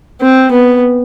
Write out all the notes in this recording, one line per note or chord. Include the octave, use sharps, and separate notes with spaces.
C4
B3